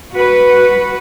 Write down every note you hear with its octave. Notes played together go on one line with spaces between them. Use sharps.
F#4 B4